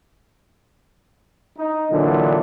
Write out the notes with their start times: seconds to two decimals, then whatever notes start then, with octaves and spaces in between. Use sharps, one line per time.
1.58 D#4
1.92 A#2 D3 E3 F#3 D4